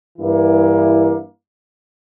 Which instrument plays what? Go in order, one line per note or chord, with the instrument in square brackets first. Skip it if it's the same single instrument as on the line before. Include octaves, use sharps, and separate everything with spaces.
[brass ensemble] G2 E3 A#3 E4